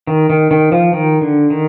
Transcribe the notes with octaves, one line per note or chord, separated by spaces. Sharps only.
D#3
D#3
D#3
F3
D#3
D3
D#3